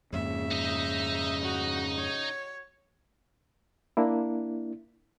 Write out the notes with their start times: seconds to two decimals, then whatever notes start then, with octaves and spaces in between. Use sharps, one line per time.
0.13 F2 G#2 C#3 A#3 E5
0.52 D#4 D#5
1.42 F#4
1.97 C#5
3.97 A#3 D4 E4